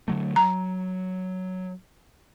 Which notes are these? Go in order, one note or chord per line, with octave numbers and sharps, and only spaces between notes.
D3 F#3 A3
F#3 A#5